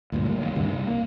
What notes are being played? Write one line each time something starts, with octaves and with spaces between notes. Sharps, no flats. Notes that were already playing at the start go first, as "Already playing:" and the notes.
D2 G2 A#2
A2 G3 A#3
F1 D#2
D2 G2 C3 D#3
C2
A#3